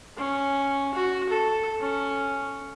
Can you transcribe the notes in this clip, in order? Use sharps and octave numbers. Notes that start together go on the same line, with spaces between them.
C#4
F#4
A4
C#4